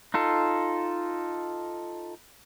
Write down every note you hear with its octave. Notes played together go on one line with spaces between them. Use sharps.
D#4 F4 A4